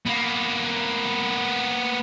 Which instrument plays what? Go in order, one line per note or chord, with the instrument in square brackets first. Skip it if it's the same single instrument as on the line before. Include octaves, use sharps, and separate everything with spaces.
[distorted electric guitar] A#3 B3